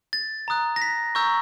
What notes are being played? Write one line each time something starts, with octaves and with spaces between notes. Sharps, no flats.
A6
A#5 D#6 F#6
A#6
B6
A#5 C#6 E6 G6